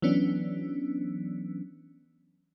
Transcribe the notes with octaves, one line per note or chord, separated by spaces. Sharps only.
E3 F#3 B3 C#4 D4